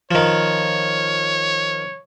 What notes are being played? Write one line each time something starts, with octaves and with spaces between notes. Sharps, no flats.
D#3 F3 C#5